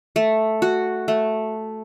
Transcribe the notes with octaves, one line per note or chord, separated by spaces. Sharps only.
A3
F#4
A3